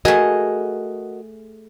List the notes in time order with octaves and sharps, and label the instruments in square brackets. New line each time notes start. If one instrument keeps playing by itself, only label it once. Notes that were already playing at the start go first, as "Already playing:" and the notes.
[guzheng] A3 G#4 [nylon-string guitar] F#4 A#4 D#5